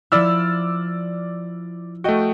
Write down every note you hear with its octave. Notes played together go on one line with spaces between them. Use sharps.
F3 E4 D5 E6 F6
A3 F#4 D#5 G5